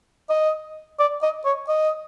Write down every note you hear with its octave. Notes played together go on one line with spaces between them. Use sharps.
D#5
D5
D#5
C#5
D#5